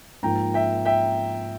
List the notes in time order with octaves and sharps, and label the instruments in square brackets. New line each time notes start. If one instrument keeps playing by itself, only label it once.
[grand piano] G#2 F3 A#3 G5 A#5
E5 G5
E5 G5